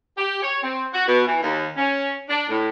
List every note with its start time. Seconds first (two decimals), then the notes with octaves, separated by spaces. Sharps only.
0.18 G4
0.42 C#5
0.62 C4
0.93 F#4
1.06 B2
1.26 E3
1.42 D#2
1.76 C#4
2.29 D4
2.48 A2